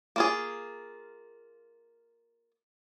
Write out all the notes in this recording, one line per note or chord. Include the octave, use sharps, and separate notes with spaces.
A#3 F4 G#4